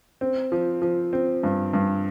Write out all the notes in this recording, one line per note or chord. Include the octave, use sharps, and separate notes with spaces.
C4
F3
F3
C4
G2
G2